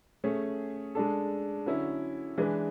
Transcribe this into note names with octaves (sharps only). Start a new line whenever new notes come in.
A3 C#4 G#4
G#3 D4 A4
D3 F#3 C#4 E4
E3 G#3 D4 G#4 B4